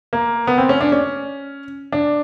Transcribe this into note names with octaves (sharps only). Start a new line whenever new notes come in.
A#3
B3
C4
C#4
D4
C#4
D4